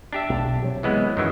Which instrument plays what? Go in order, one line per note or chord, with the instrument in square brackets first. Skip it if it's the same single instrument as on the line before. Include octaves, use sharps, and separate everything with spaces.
[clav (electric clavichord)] D4 G4 E5
[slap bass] B1
C3 F#3
[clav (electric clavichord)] E3 G#3 B3
[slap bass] F#2 [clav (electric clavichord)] D#3 E3 F#3